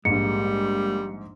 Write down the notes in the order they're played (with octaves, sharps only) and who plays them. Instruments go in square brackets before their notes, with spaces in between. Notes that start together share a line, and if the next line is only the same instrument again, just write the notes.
[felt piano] A#1 G#2 [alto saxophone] G3 [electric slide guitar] G#3 A#3 [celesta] C#7